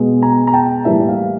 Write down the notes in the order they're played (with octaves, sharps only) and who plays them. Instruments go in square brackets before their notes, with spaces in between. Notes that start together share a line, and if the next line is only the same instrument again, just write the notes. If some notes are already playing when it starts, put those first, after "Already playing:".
Already playing: [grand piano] B2 G#3
G#5 A#5
A#5
G5 A5
A2 E3 G3 A#3 E5
F5